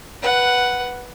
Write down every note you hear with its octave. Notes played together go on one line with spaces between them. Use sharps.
B4 F#5